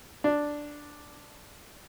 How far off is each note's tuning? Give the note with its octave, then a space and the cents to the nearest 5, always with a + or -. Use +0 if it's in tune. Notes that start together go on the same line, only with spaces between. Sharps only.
D4 +0